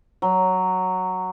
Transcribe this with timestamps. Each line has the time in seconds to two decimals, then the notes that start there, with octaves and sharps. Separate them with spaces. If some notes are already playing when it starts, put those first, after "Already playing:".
0.22 F#3